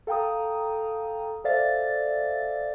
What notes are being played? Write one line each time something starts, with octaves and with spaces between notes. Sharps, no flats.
A4 F5 G5 A#5 D#6
A4 C5 D5 E5 F5 A6